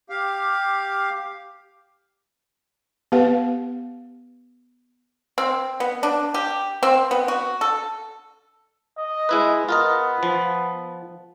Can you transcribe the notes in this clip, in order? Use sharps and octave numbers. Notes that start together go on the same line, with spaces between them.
G4 F5
B3 G4 B4 F5 F#5
C4
B3
D4
G4
C4
B3
F#4
A4
D#5
G#3 E4 B4
B3 F4 A#4 D#5
F3